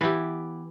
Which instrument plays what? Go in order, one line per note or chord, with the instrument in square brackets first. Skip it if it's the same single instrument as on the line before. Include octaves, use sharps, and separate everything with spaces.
[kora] E3 B3 E4 G4